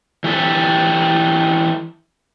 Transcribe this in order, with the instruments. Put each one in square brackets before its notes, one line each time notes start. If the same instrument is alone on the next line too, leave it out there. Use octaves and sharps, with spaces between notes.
[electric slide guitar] E3 G4 A4